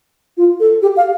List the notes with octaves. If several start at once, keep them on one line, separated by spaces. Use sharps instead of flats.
F4
A4
G4
F5